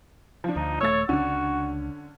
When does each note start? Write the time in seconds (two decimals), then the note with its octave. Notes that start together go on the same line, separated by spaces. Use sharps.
0.44 F3 D4
0.56 D2 D#4
0.81 D#1 A3 C#5 E6 A6
1.09 C#2 D3 C#4 D4 F#4